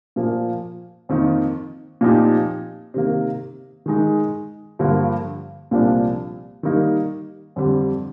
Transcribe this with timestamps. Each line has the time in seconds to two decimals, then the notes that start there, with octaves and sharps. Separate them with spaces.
0.16 A#2 F3 A#3
1.09 F2 D#3 A#3 D#4
2.01 A#2 F3 C4 D#4 G4
2.94 C3 D#3 A#3
3.86 D#3 G#3 D#4 G#4
4.79 G2 D3 F3 A#3 F4
5.71 C2 A#2 F3 A#3 D4
6.63 D#3 G3 A#3 D#4
7.56 F2 D3 G3